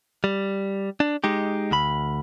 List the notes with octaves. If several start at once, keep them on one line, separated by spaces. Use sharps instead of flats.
G3
D4
G#3 D#4 G4
D2 B5